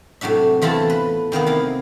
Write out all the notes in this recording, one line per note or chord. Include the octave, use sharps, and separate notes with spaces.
A2 C3 F#3 D4 E5
E2 E3 C4 F4 A4 A5
B4
C3 D#3 A#3 B3
E4 A#4 F5